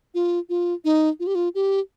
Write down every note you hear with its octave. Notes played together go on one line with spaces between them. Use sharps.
F4
F4
D#4
F4
G4
F4
G4